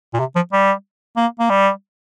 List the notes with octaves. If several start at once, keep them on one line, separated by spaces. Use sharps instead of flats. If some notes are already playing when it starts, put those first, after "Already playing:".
A#2
C3
F3
G3
A#3
A#3
G3